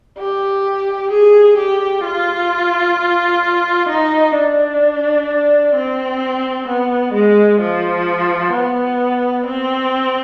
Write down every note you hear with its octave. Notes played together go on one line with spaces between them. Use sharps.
G4
G#4
G4
F4
D#4
D4
C4
B3
G#3
F3
B3
C4